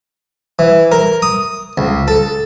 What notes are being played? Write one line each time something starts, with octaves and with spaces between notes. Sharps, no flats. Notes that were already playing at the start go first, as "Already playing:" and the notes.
E3
A#4
D#6
C#2
A4